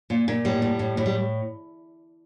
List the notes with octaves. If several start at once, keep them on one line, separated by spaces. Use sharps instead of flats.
A#2
A#2
A2 G3
A2
A2
A2
G3